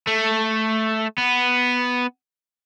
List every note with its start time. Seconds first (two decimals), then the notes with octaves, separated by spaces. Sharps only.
0.07 A3
1.18 B3